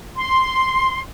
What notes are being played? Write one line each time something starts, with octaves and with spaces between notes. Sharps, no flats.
C6